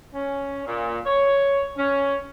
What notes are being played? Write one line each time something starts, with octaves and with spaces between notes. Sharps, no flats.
C#4
A#2
C#5
C#4